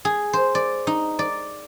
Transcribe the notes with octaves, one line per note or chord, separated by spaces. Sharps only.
G#4
C5
D5
D#4
D5